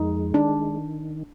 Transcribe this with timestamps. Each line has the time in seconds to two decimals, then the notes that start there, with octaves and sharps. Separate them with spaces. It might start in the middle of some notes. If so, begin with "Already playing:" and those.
Already playing: F2 G#3 D#4
0.34 D#3 D4